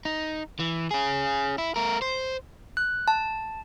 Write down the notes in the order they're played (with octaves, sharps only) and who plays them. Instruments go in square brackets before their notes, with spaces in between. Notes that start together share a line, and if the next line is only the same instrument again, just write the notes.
[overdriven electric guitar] D#4
E3
C#4 G#4
E4
A3 A#4
C5
[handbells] F#6
A5